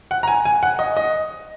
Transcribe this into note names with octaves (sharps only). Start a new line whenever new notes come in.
F#5
A#5
G#5
G#5
F#5
D#5
D#5